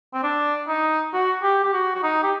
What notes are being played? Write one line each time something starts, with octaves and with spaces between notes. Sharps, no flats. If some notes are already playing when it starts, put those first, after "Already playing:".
C4
D4
D#4
F#4
G4
G4
F#4
F#4
D#4
G4